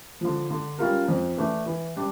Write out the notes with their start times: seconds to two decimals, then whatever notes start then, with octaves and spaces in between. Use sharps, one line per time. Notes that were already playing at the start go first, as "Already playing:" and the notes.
0.21 D3 F3
0.50 D3
0.79 G3 C#4 F4 A#4
1.08 F2
1.37 E3 A3 D4
1.66 E3
1.96 G3 D4